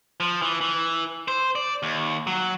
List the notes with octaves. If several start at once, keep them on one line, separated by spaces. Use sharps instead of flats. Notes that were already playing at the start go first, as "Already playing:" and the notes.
F3
E3
E3
C5
D5
D#2
F#3